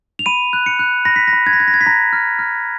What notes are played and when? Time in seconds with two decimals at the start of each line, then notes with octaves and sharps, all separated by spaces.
0.19 F7
0.26 B5 D#7
0.53 F#6
0.66 C#7
0.79 F#6
1.05 B5 A#6
1.16 B6
1.27 A#6
1.33 B5
1.46 G#6
1.53 A#6
1.60 F#6 G#6
1.68 A#6
1.74 G#6
1.81 B6
1.86 A#5 A#6
2.13 F6
2.39 F6